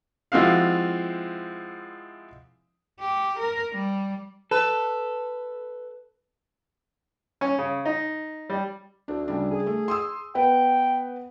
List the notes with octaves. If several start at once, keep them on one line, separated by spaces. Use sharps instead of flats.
F3 G#3 C4 E4 F#4 F5
G4
A#4
G3
A4 B4
C#4
C#3
D#4
G3
D2 D4
C#3 G3 D4
G#4
A3
C6 D#6 E6
B3 B4 F#5 G5